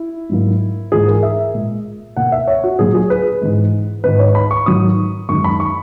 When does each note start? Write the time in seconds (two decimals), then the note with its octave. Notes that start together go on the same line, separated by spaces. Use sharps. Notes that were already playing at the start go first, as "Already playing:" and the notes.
Already playing: E4
0.30 G#2 F#3 A#3
0.92 G#2 E3 A#3 G#4
1.08 A#4
1.23 E5
1.54 A#2 G#3
2.17 B2 A#3 F#5
2.32 E5
2.47 C#5
2.64 F#4
2.79 A#2 F#3 A#3 G#4
2.95 G#4
3.10 B4
3.41 G#2 E3 G#3
4.04 G#2 D#3 G#3 B4
4.20 C#5
4.35 B5
4.51 C#6
4.66 G#2 D#3 F#3 D#6
5.29 F#2 D#3 G#3 C#6
5.44 B5
5.60 C#6